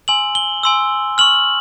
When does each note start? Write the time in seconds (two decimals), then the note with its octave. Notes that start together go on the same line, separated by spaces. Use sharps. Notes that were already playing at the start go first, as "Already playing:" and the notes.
0.08 G#5 C6 E6 F#7
0.35 G7
0.63 G#5 C6 E6
1.18 C#6 F6 F#7